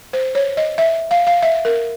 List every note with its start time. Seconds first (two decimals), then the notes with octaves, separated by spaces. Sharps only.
0.13 C5
0.35 C#5
0.57 D#5
0.78 E5
1.11 F5
1.27 F5
1.42 E5
1.65 A#4